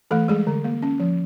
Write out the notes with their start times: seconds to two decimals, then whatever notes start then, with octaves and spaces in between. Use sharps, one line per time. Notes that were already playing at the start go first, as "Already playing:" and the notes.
0.11 E3 A3 A4
0.28 G3 G#3 G#4
0.47 D3
0.64 A#3
0.82 C#4
1.00 F3